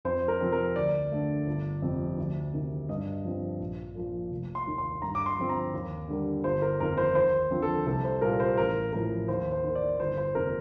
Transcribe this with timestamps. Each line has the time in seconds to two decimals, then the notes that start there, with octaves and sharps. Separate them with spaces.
0.05 F2 C5
0.28 A#4
0.40 C3 F3 C4
0.52 A#4
0.76 D2 D5
1.11 D3 A3
1.47 G1
1.82 F2 C3 F3
2.18 D2
2.54 C3 D#3
2.89 G2 D#5
3.25 F3 C4
3.60 A#1
3.95 A#2 F3 A#3
4.31 F1
4.55 C6
4.67 D#2 D#3 A#3
4.78 C6
5.02 G2 A#5
5.15 D6
5.26 C6
5.37 D3 F3 C4
5.49 A#5
5.73 D#2
6.09 D3 G3 A#3
6.44 G1 C5
6.62 A#4
6.80 F2 D#3 A#3 A#4
6.97 C5
7.15 D#2 C5
7.51 D3 F3 C4
7.62 A4
7.86 C2 A4
8.04 C5
8.21 A#2 G3 A#3 A#4
8.40 C5
8.57 A1 A#4
8.93 A2 F3 A#4
9.28 D#2 C5
9.52 C5
9.64 D#3 A#3
9.75 D5
9.99 G1 C5
10.17 C5
10.35 F2 C3 D#3 A#3 A#4